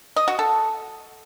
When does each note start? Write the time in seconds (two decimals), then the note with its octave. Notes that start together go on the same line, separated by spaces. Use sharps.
0.16 D#5
0.28 F#4
0.39 A4